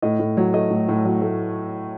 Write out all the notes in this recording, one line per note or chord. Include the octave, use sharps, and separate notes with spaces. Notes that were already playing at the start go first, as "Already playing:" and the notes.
A2 D#5
A2
F#3
A3 D#5
A2
A2
F#3
A3